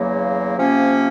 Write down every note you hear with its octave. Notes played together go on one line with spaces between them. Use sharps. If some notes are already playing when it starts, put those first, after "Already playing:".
Already playing: E2 C#3 F#3 A#3
C3 F3 A#3 C#4